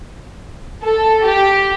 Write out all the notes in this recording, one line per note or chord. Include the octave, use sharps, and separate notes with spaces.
A4
G4